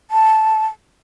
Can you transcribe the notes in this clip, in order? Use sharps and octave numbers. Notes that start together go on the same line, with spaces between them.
A5